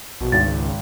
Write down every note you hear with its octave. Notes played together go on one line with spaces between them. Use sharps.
A#1 B2
G#1 D2 A6
C#2